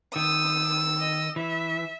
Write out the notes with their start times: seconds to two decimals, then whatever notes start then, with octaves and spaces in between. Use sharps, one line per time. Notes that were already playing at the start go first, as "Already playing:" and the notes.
0.16 D#3 D#6 E6
0.99 D#5
1.36 E3 E5